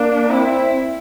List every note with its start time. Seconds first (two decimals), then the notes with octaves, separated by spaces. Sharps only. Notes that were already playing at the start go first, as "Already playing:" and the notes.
Already playing: A#3 D4
0.30 C4 E4